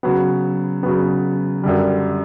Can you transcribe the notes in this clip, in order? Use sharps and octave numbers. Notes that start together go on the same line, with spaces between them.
C#3 F#3 B3
C#3 F#3 B3
F#2 D3 G3